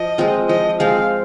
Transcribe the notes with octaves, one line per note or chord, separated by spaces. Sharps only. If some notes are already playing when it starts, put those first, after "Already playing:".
Already playing: F3 D#5
G#3 C4 F4
F3 D#5
G#3 C4 F4 F5